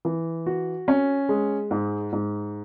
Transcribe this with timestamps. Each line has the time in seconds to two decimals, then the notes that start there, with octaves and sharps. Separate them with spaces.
0.05 E3
0.46 F#4
0.88 C#4
1.29 G#3
1.71 G#2
2.12 G#2